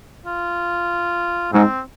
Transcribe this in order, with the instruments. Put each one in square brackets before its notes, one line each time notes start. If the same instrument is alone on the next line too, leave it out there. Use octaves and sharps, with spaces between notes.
[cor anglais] F4
[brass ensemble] G#2 [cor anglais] C4